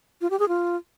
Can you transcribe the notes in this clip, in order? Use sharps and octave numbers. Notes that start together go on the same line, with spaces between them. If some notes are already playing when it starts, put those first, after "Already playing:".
F4
G4
G#4
F4